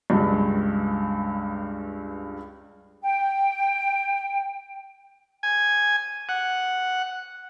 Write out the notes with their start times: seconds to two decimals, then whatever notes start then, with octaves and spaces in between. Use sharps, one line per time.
0.10 C#2 G2
3.02 G5
5.43 G#5
6.29 F#5